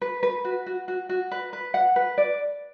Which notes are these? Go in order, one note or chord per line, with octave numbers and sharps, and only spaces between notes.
B4
B4
F#4
F#4
F#4
F#4
B4
B4
F#5
B4
D5